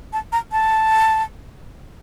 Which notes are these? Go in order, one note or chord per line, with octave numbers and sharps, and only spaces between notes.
A5
A#5
A5